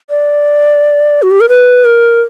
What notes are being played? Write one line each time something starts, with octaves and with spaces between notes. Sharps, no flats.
D5
F#4
G4
A#4
B4
A#4